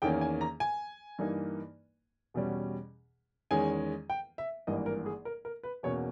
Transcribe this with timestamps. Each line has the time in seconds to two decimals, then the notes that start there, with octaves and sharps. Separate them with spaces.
0.02 E2 D#3 A#3 C#4 G5
0.21 G#5
0.41 A#5
0.60 G#5
1.19 G2 E3 A#3 D#4
2.34 E2 B2 G3 C#4
3.51 E2 D#3 G#3 C#4 G#5
4.10 G5
4.38 E5
4.67 G#1 G2 E3 A#3 D#5
4.86 A#4
5.06 G#4
5.25 A#4
5.45 A#4
5.63 B4
5.83 E2 B2 A#3 C#4 C#5